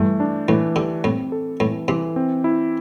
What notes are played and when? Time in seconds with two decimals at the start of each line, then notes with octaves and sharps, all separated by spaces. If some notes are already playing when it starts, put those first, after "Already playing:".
Already playing: G2 E3 A3
0.20 D4
0.48 A2 E3
0.76 D3 G4
1.04 A2 C4
1.32 A4
1.60 A2 E3
1.88 C3 E3
2.16 C4
2.44 E4